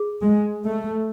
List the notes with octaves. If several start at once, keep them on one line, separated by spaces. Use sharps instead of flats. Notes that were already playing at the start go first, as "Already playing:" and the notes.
Already playing: G#4
G#3
A3